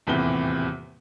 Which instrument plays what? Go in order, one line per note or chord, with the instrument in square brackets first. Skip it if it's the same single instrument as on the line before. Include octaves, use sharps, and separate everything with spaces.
[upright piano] D#1 E2 A2 C3 G7